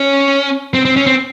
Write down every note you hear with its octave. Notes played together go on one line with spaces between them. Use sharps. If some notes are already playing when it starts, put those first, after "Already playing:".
Already playing: C#4
C4
C4
C#4
C4